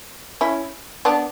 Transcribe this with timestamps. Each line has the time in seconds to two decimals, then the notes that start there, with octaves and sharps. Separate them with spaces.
0.41 C#4 E4
1.05 B3 D4